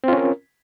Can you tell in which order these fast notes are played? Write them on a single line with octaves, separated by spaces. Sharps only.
C4 F4 C#4 A#4